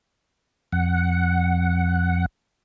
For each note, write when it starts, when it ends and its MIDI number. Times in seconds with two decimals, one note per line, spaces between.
0.72 2.26 41
0.72 2.26 78